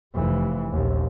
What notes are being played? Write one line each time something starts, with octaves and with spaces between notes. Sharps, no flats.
F1 E3
A#1 D#2